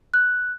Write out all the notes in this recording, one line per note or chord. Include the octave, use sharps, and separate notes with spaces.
F#6